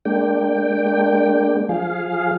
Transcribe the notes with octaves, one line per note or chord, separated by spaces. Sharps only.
G#3 A#3 D4 G5
F3 G#4 F5